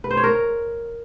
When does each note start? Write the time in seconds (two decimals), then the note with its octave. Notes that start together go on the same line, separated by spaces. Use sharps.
0.04 B4
0.11 C5
0.17 C#5
0.24 A#4